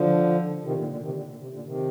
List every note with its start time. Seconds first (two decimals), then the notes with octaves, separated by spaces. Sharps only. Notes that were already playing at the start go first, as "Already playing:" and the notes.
Already playing: D3 F3
0.63 C3 D#3
0.76 A#2 D3
0.88 A#2 D3
1.01 C3 D#3
1.13 A#2 D3
1.26 A#2
1.38 C3
1.51 A#2 D3
1.64 C3 D#3